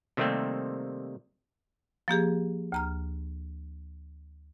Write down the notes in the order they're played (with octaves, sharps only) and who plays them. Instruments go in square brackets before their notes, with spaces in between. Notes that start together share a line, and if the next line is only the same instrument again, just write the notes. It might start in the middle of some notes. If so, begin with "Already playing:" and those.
[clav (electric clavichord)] C3 D#3 G3 A3 A#3 C4
[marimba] F3 A#3 G4 G#4
D2 A#5 F6